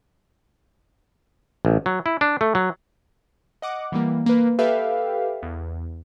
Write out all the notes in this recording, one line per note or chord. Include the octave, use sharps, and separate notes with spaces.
A1
F#3
E4
D4
A3
F#3
D#5 F#5 D6
E3 G3 A#3
A#3 B4
G4 A4 B4 E5 F5 G5
E2